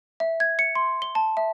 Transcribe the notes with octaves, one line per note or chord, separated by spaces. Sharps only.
E5
G#6
C#7
C6
G7
A5
E5